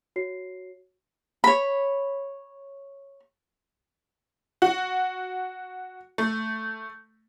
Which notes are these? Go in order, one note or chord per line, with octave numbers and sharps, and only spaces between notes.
F#4 C#5 C7
C#5 B5
F#4
A3